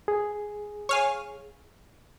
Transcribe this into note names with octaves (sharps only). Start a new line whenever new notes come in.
G#4
C#5 F5 G#5